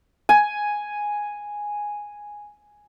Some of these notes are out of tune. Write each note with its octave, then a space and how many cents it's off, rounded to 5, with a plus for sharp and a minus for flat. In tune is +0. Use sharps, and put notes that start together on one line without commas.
G#5 +0